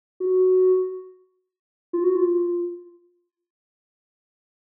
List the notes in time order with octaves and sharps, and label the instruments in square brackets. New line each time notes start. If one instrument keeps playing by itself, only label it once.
[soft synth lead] F#4
F4
F#4
F4